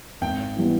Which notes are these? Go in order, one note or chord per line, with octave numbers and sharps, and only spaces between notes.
G#1 G5
E3 G3 B3